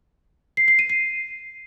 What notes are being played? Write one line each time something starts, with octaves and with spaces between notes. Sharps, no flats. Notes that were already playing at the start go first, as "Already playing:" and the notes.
C7
C7
D#7
C7